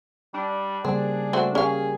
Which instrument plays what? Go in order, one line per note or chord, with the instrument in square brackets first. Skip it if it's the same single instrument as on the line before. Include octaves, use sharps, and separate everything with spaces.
[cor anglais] G3 [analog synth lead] D4
[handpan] C#3 G3 A#3 [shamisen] C4 [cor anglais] G#4
[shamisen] A3 C4 F#4
[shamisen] C#4 F5 [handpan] G4 A#4 [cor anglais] G#4